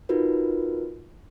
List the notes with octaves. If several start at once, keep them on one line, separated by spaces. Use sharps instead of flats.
D#4 F4 F#4 A#4 B4